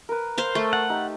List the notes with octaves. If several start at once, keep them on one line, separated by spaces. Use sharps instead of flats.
A#4 B4
C5 F5
A3 C#6
F#5 A5
D#4 G4